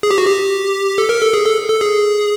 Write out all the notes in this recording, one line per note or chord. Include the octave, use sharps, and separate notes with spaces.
G#4
G4
F#4
G4
A4
A#4
A4
G#4
A4
A4
G#4